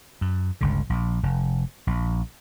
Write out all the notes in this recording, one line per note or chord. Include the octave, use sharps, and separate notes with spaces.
F#2
G1 C#2 D3
A#1
F1
A#1